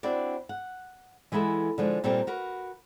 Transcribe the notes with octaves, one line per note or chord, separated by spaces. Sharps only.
C4 D4 E4 F#4 D5
F#5
E3 G#3 B3 E4 A4
D3 F3 G#3
A#2 G3 C4 A4 A#4 G5
F#4 A#4 B4